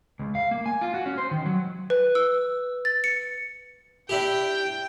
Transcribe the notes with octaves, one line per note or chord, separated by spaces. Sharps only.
C#2
F5
A#3
G#5
F4
F#4
C#4
C5
D#3
F#3
B4
E6
A6
C#7
D4 E4 G4 G5